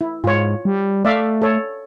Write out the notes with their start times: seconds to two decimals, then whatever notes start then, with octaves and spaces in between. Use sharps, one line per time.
0.01 E4
0.24 G#2 F4 C#5
0.65 G3
1.05 A3 D5 E5 F5
1.42 A4 C#5